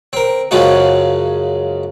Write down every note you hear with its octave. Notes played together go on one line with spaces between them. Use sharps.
C4 A#4
F#2 C#3 F3 G#3 C#4 F#4